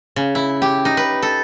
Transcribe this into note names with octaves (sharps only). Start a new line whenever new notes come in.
C#3
E4
G4
D#4
B4
A4